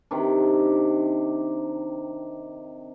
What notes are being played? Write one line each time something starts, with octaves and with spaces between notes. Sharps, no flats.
C3 D#3 D4